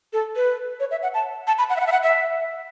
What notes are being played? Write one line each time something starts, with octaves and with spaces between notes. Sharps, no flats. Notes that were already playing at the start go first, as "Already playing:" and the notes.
A4
B4
C#5
E5
F#5
A5
A5
B5
F#5
E5
F#5
E5
F#5
E5